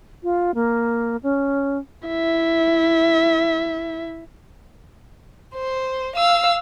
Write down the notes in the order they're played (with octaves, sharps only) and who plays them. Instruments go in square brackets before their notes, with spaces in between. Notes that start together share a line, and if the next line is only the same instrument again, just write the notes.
[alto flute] F4
A#3
C#4
[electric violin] E4 E5
[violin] C5
F5 E6